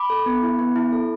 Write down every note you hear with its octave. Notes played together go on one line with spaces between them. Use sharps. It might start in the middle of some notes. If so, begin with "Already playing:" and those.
Already playing: B5 D6
A4
B3
E4
B3
E4
A4